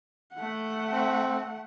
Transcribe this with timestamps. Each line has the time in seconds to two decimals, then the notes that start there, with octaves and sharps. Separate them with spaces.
0.35 A3 F#5
0.92 C4